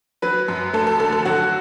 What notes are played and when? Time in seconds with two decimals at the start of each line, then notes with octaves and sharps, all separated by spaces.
0.22 F#3 B4
0.48 F#2
0.73 A3 A4
0.87 A4
1.00 D3 A4
1.12 A4
1.25 F#3 F#4